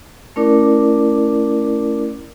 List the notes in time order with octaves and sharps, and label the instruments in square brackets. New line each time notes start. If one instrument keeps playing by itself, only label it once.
[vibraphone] A3 C#4 E4 A#4 D5 D6